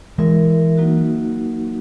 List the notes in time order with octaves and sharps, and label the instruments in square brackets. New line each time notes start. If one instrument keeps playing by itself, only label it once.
[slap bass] E3 G#3 [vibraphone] E4 A#4 E5
[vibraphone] F#3 A#3 D#4 F#4